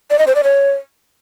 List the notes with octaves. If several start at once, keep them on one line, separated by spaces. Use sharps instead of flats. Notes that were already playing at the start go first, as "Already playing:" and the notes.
D5
D#5
C5
D5
C#5